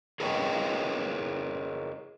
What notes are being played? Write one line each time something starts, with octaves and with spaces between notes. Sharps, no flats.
G#4 A#4 B4 C#5 D#5 G5